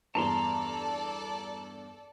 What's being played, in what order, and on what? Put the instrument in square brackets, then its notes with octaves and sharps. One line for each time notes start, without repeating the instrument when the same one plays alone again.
[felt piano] E2 G2 [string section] A4 D5 [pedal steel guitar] A5 A#5 C6